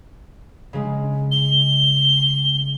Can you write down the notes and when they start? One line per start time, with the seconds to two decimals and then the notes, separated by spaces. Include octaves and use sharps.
0.73 C#3 G#3
1.31 G7